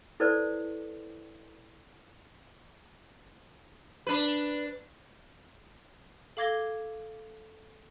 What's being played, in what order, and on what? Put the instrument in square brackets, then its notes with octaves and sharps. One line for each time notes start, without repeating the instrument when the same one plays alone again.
[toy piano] E4 A4 B4 C5 D5
[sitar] D4 B4
[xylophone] A4 F5 D6 G#6 A#6 G7